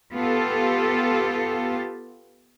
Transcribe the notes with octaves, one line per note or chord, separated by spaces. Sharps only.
B3 F4 G4 A4